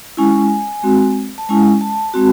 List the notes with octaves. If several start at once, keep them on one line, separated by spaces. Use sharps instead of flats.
G#3 C#4 E4 G#5
G#3 C4 F#4
A5
G#3 C#4 E4 G#5
A5
G#3 C4 F#4